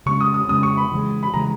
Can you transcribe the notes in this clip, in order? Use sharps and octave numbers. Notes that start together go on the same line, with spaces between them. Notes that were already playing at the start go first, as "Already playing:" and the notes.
C#3 G#3 C#4 C#6
D#6
D#6
C#3 G#3 C#4 D#6
C#6
B5
C#3 E3 G#3
B5
C#3 E3 G#3 A#5